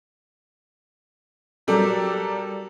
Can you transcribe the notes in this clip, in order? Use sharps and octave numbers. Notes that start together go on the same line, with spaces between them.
F#3 G3 A4 A#4 D5